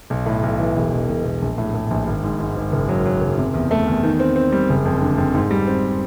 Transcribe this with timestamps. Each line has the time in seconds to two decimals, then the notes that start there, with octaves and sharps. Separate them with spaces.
0.10 B1
0.26 A2
0.43 B1
0.59 E3
0.76 E1
0.92 E1
1.09 E1
1.25 E1
1.42 A#1
1.58 A2
1.74 A2
1.91 A#1
2.07 G#1
2.23 G#2
2.40 G#2
2.56 G#1
2.72 F#1
2.89 F#3
3.06 F#3
3.21 F#1
3.38 C3
3.54 E2
3.71 A3
3.87 E2
4.03 D#3
4.20 C4
4.36 C4
4.52 G3
4.70 F#1
4.85 F2
5.01 D3
5.18 F2
5.35 G#2
5.51 G3
5.67 C4